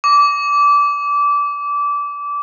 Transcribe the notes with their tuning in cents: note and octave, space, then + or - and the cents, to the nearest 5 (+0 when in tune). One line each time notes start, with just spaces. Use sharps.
D6 -20